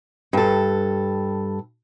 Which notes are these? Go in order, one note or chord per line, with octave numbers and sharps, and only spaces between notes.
G2 A4